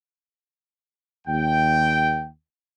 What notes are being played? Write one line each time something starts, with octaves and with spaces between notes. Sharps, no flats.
D#2 G5